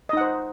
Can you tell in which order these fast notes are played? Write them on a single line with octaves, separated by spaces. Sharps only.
D#5 D#4 F#5 C5